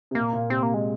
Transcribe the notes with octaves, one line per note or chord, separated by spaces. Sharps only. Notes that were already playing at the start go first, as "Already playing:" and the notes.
C3
A#2 A#3
A#2
C3 C4
A#3
G#3